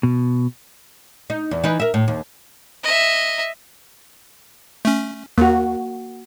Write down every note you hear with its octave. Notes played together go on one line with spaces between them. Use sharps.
B2
D#4
E2
E3 D#4 B4
A#4 E5
A2
D#2
D#5 E5
A3 C#4
D#2 A#3 F#4